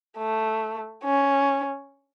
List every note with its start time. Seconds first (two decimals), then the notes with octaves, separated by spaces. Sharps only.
0.17 A3
1.04 C#4